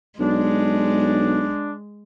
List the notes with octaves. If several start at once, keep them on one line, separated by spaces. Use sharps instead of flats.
B1 G#3 D4